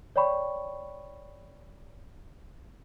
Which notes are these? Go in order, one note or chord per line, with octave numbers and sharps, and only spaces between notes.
C#5 D5 G5 B5 C#6